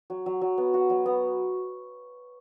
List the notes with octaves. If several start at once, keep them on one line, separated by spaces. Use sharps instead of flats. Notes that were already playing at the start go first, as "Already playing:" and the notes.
F#3
F#3
F#3
B3
F#4
F#3
B3